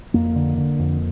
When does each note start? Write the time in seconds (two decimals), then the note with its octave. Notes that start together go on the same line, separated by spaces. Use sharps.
0.14 F2 A#3
0.36 D3
0.57 D3
0.79 F2